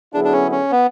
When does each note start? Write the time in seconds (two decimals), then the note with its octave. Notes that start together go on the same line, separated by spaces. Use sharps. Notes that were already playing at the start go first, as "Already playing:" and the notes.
0.13 D3 F#3 B3 D4 E4 G#4
0.24 D4
0.32 C#4
0.51 C#4
0.72 B3